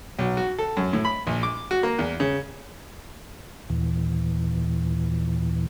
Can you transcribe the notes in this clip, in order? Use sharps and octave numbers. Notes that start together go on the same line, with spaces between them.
B1
F#4
A4
F#2
A2
B5
A#1
D6
F#4
A#3
E2
C#3
D#2 A#2 E3